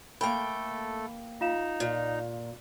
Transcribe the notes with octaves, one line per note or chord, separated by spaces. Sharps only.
A3 A#3 A4 G5 B5
D#4 F4 F5 E7
A#2